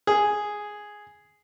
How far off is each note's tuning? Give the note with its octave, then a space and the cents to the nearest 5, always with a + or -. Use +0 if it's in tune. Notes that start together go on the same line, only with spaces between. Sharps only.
G#4 +0